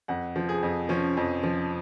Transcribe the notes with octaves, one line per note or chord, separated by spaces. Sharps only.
F2 F#5
F3
G#4
F2
F3 C#4
F2
F3